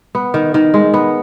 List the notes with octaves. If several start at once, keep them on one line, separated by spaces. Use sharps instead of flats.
B3
D#3
D#3
G#3
B3